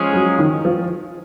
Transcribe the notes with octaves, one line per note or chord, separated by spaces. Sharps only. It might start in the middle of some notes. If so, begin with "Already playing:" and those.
Already playing: F3 G#3 C#4 G#4 C#5
F#3
D#3
F3